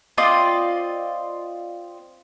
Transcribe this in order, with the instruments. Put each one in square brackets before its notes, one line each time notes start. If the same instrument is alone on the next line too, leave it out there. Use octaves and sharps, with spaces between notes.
[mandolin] C4 F4 D5 D#5